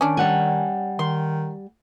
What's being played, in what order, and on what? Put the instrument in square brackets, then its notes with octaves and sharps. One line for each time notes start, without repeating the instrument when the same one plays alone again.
[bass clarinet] D#3 [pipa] C#4 D4
[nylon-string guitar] G3 F#5 G#5
[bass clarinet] D#3 [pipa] C6